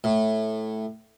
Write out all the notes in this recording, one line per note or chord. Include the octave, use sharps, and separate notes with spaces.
A2